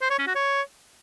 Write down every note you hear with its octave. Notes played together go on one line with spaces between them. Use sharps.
C5
C#5
C#4
F#4
C#5